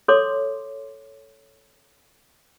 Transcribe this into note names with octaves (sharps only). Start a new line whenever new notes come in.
A4 C#5 C6 D6